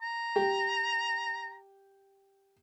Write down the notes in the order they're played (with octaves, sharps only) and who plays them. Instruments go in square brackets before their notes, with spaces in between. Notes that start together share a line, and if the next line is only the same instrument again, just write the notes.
[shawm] A#5
[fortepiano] G4